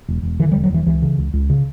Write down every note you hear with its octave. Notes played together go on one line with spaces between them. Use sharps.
E1
E1
D3 E3
G3
E1
F#3
E1 E3
C#2 E3
C#3
C#2
C#2
C#3